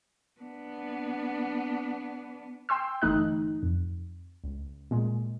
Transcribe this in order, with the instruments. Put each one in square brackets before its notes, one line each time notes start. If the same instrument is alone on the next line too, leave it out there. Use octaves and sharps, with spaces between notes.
[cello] B3 D4
[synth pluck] G5 C6 E6
G1 E3 A3 D#4 D#5 F#6
F2
C#2
A#2 G#3